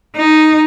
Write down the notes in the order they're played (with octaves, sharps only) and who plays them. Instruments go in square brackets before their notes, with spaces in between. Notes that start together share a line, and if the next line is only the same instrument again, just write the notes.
[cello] D#4